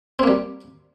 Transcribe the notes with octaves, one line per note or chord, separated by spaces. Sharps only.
G3 A#3 C4